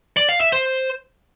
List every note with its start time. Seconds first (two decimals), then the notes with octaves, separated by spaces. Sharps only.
0.17 D5
0.29 F5
0.41 E5
0.53 C5